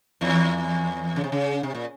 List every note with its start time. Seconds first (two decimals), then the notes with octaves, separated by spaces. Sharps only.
0.21 E2 E3
1.16 C#3
1.24 C3
1.32 C#3
1.63 C3
1.75 A#2